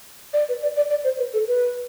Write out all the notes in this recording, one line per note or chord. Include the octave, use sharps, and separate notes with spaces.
D5
B4
D5
D5
D5
C5
B4
A4
B4